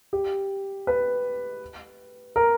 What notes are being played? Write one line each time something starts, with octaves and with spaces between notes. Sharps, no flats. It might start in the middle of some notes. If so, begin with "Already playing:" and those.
G4
B4
A#4